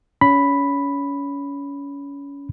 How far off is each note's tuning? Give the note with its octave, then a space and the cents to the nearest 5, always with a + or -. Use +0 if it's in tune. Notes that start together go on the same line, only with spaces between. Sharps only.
C#4 +25 B5 +0